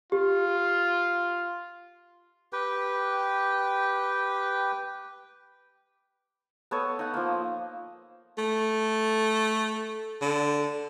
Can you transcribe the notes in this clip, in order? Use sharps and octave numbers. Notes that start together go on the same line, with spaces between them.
F4 G4
G4 B4 G5
B3 A4 C#5 D#5
D#4 F#5
F3 A#3
A3
D3